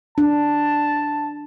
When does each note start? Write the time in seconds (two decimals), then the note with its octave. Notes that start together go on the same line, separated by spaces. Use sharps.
0.18 D4 A5